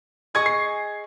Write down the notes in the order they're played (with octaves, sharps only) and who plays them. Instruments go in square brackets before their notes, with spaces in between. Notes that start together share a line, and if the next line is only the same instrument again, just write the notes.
[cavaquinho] G#4 D#5 G#5 C#6 [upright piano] G#6
[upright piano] C7